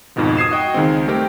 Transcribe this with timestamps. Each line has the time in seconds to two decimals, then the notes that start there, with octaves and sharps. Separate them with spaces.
0.16 G#1 F2 G#2 B2 D#3 F3
0.37 D#6 G#6 C7 E7
0.51 F#4 D#5 G5
0.74 C#2 D#3 G#3 C4
1.07 G3 A3 C4 G4 A#4